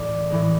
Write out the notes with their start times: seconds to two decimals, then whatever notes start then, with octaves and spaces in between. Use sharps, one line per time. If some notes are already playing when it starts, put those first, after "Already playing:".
Already playing: A2 E3 G#3 D5
0.30 A2 E3 G#3